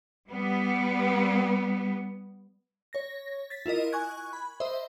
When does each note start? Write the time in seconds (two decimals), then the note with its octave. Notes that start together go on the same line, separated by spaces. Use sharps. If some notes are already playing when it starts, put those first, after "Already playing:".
0.29 G3 B3
2.93 C#5 A#6
3.50 A6 B6
3.66 E4 F4 A#4 D#5
3.92 G#5 C#6 F#6 G#6
4.33 B5
4.60 C5 D#5 E5